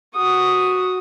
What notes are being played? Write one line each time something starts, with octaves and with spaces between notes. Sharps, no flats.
F#4 D#6